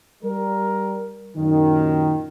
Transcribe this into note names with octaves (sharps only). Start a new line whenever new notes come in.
G3 A#4
F#2 A#2 D#3